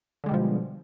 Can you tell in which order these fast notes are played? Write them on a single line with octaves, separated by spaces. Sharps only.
D3 G#3 G3 B2 F3